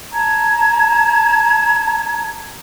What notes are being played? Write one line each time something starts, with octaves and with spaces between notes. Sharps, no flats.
A5 A#5 G#6